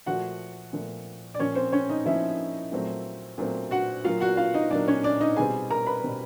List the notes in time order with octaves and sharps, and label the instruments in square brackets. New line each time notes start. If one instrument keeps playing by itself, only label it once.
[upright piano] A#2 F3 A3 F#4 F#5
A#2 F3 A3
D5
A#2 F3 A#3 C#4 C#5
C4 C5
C#4 C#5
D#4 D#5
A#2 F3 A#3 C#4 E4 E5
A#2 F#3 A3 C4
A#2 F#3 A3 C4
F#4 F#5
A#2 F#3 A#3 F4 F5
F#4 F#5
F4 F5
D#4 D#5
A#2 F#3 A#3 D4 D5
C#4 C#5
D4 D5
D#4 D#5
B2 G3 C4 G#4 G#5
A#4 A#5
B4 B5
B2 G3 C4